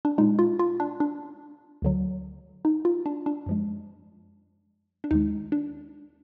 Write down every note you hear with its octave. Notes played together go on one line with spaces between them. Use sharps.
D4
A#2 G#3 D#4
F4
F4
D4
D4
D2 D3 F#3
D#4
F4
D4
D4
F#2 F3 G#3
D4
D#2 D#3 G#3 D#4
D4